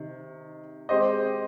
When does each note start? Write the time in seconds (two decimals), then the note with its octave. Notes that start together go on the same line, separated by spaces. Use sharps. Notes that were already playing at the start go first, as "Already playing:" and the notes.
Already playing: C3 D#3
0.89 G#3 C4 G4 C5 D#5